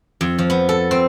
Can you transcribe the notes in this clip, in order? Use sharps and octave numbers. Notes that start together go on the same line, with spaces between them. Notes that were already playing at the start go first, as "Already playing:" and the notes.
F2
F3
B3
A4
C4